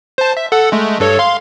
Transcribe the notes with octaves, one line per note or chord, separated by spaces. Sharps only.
C5 A5
E5
A4 F#5
G#3 A3
G2 A4 C#5
F5 C6